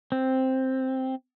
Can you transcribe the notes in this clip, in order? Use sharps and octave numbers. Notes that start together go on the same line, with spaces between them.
C4